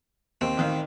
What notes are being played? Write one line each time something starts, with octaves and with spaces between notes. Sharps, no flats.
D#2 C4
A1 D#3 F5